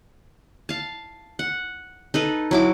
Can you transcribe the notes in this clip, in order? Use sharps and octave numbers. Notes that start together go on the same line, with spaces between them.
F5 A5
F#5
D#4 A4 B4
F#3 E4 D6